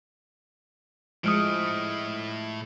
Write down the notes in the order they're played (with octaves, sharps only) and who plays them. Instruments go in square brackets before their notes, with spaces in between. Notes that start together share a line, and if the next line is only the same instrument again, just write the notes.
[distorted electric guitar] A2 A3 [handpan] F3 G#3 [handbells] D#6 F6 D7